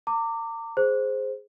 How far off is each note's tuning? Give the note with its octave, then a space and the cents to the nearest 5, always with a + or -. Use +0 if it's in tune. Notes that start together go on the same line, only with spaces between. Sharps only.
A#5 -40 D6 +0
G#4 +5 C5 +0